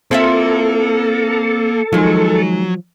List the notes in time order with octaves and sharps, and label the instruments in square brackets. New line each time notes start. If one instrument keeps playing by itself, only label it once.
[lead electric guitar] A#3 [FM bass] C4 [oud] E4 F4 E5 [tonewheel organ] A4
[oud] D#3 G#3 [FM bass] F3 [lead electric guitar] F#3